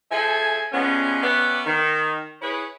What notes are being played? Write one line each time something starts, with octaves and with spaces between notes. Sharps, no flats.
F3 G#4 A4 E5 G#5
F3 G3 G#3 B3 C#4
B3 C#4 G4 B4 D5 E5
D#3
E4 G#4 B4 C#5